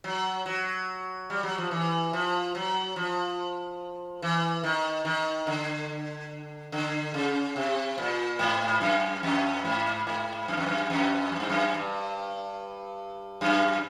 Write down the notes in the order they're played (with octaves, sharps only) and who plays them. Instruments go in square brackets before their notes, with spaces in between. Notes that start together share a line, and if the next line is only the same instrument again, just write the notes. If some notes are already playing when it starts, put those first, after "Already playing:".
[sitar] F#3
F#3
G3
F#3
F3
E3
F3
F#3
F3
E3
D#3
D#3
D3
D3
C#3
C3
A#2
G#2
F#2
F2
G#2
G#2
F#2
F2
F#2
F2
F#2
G2
F#2
G2
F#2